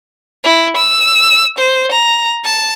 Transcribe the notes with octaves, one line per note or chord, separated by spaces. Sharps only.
E4
E6
C5
A#5
A5